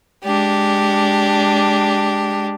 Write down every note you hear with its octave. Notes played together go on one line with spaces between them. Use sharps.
G#3 D4 G4